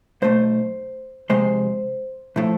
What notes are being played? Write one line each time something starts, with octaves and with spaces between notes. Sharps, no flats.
B1 B2 A3 C5
F2 C3 G#3 C5
A2 F3 A3